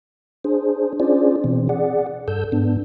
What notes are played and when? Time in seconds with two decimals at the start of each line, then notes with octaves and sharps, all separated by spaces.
0.44 D4 G#4 C5
1.00 C#4 D4 F4 G#4 C5 D5
1.44 B2 E3 C4
1.69 G#4 D5 F#5
2.28 G2 A4 E6 G6
2.52 G#2 B3 D4